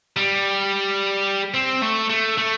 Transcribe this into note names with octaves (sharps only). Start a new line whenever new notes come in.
G3
C4
A3
A3
A3